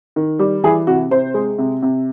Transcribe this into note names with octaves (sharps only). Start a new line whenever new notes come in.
D#3
G3
E3 G#4
C3 F#4
C3 C5
G#3
C3
C3